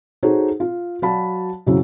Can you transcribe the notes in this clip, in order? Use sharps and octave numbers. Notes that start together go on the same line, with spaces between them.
D#4 F#4 G#4 A4 C5 C#5
F4
F#3 F#4 D5 F5 A5 B5
F#2 C#3 F#3 C4 E4